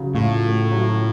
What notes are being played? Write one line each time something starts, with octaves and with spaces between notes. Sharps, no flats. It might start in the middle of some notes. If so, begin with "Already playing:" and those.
Already playing: C#3 F#3
A2 F4
A3
F#3